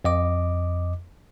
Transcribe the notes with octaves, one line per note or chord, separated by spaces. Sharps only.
F2 D#5 D6